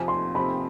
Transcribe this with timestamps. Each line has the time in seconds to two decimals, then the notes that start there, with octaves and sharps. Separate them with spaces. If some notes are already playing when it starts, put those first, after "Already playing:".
Already playing: F2 C3 F3 G#5
0.08 C6
0.35 C3 F3 C4 B5